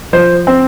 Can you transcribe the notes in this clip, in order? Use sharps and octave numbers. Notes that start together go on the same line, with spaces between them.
F3 C5
C4